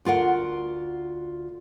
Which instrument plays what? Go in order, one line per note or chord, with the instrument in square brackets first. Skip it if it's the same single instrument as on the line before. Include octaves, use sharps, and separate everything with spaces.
[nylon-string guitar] D2 F4 A#4 F#5